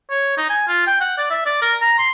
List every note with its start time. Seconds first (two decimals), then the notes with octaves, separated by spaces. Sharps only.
0.10 C#5
0.37 D#4
0.50 G#5
0.68 F4
0.87 G5
1.01 F#5
1.18 D5
1.30 E5
1.46 D5
1.62 A#4
1.82 A#5
1.98 C6